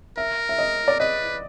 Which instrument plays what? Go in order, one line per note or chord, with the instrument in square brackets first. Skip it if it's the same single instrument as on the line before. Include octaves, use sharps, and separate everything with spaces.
[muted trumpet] A#4 [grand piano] E5
[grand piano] E5
D#5
D5
[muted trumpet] B4 [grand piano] D#5